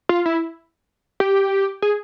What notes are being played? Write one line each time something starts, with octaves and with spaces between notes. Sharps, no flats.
F4
E4
G4
G#4